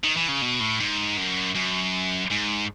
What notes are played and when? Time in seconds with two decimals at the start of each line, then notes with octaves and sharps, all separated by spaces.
0.04 D#3
0.17 E3
0.29 C#3
0.42 B2
0.60 A2
0.80 G#2
1.17 F#2
1.55 F#2
2.30 G#2